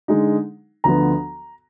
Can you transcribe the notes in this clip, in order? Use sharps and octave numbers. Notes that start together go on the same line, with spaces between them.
D3 G#3 D#4
D2 D3 F3 B3 A#5